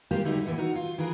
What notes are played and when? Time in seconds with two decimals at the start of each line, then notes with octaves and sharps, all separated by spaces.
0.11 G#3 A#3 C4 F4 G4 A#4
0.24 D3 F#3 G3 A3 D#4
0.46 A#2 E3 A3 B3
0.58 D#4 F#4 A#4
0.75 F4
0.98 E3 F4 G#4 A#4 B4